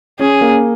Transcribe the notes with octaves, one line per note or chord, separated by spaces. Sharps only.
C#4 G#4
A#3